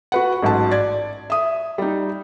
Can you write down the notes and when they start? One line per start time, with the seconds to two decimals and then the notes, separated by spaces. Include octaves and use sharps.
0.12 F#4 B4 F#5
0.42 A1 G#2 F#3 A5
0.71 D5 G#6
1.30 E5 D#6
1.78 G3 D#4